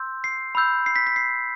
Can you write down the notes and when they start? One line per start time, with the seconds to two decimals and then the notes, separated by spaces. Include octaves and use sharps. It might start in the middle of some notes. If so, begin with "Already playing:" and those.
Already playing: C6 E6 G6
0.24 C7
0.55 B5 E6 G6
0.86 C7
0.96 B6
1.07 B6
1.16 C7